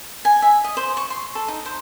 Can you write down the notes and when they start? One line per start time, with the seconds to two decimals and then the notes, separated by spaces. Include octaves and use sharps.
0.25 G#5
0.42 E5
0.64 D#5
0.77 C5
0.97 C#6
1.10 C6
1.35 A4
1.48 D#4
1.66 C5